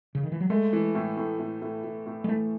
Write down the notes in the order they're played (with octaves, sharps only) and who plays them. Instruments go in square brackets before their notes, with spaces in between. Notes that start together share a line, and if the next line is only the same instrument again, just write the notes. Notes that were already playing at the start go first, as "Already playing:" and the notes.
[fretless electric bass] C#3
D#3
E3
F#3
[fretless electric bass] G#3 [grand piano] A3
[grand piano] E3
A2
A2
A2
A2
A2
A2
[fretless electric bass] G#3
[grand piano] E3 [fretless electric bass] A3